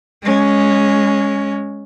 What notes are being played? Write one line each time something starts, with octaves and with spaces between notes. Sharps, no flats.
G#3 C#4